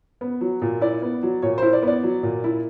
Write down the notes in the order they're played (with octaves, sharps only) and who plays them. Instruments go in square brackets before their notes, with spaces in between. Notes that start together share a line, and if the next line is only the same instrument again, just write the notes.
[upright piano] B3
F#3
A#2
E4 D5
B3
F#3
A#2 C#5
E4 C5
D5
B3
D5
F#3
A#2
E4